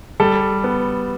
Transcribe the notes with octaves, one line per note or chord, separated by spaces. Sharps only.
G3 A4
B3